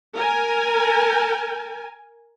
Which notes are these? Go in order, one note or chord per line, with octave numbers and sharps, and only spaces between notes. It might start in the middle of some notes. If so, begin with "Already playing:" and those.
A#4 G#5